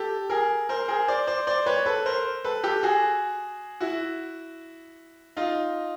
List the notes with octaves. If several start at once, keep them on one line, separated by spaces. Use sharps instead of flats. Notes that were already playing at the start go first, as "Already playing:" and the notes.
Already playing: G4 A4
G#4 A#4
A#4 C5
G#4 A#4
C5 D5
C5 D5
C5 D5
B4 C#5
A4 B4
A#4 C5
A4 B4
G4 A4
F#4 G#4
E4 F#4
D#4 F4